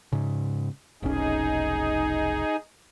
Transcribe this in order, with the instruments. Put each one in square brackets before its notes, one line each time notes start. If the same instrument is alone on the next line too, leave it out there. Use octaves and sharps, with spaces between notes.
[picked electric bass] G#2 C#3
[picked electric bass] F1 B1 C#4 [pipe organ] D#4 G#4